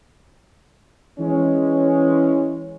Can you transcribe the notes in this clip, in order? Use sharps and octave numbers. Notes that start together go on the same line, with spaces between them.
E3 G#3 C#4